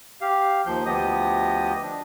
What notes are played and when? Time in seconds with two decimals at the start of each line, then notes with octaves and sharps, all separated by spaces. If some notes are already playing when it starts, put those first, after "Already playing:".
0.21 G4 F5
0.66 D#2 F3 G6
0.86 D2 F3 B3 G4 D#5 D#6
1.83 D4